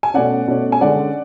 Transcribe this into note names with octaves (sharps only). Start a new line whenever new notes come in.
G#5
B2 A3 C#4 D5 F#5
B2 A3 C#4
G#5
D3 G#3 C#4 D5 F#5